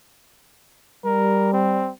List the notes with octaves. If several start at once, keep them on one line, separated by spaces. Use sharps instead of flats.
G3 A#4
C4